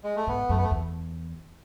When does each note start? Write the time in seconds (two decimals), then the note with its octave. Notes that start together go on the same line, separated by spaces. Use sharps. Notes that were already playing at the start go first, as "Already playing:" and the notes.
0.04 G#3
0.16 A3
0.27 G#2 B3
0.49 F#2 A3
0.57 B3
0.63 A3
0.71 E2